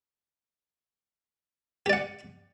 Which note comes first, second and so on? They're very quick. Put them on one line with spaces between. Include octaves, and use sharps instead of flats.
G4 D5 F#5